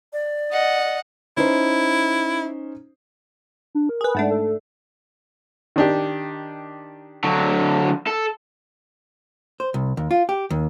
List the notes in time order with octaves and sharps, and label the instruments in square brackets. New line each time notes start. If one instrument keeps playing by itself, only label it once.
[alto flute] D5
[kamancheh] D#5 [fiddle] F#5
[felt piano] C#4 D#4 C5 [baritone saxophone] E4
[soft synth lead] D4
A#4
[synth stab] G#4 B4
[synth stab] G#2 A3 D4 [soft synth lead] F#5
[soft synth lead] A4
[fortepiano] D#3 D4 G4
[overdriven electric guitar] D3 F#3
A4
[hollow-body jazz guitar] C5
C2
D#2
F4
G4
D#2